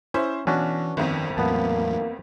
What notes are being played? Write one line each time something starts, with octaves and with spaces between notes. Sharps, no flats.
C#4 E4 C5
B1 E3 C#4 D4 F#4
G1 F2 D#3
E2 A2 F#3 A#3 B3 A5